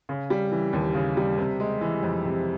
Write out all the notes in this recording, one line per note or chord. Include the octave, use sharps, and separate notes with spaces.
C#3
G3
E3
D#2
C#3
G3
C3
G#3
E3
F2
C3